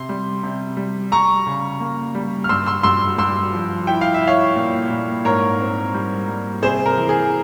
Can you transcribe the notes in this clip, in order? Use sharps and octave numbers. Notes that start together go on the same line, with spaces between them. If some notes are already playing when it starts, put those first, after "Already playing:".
Already playing: C3 C6
G3
C3
G3
G3 A#5 C#6
C#3
A#3
G3
F6
G2 C6 E6
C6 E6
G2 C6 E6
G2 C6 E6
F3
E4 G5
F5
E5
E4
C#5 F5
A#2
A#2
G#2 A#4 C#5
C4
G3
G3
C3 G#4 C5
A#4
E3
G#4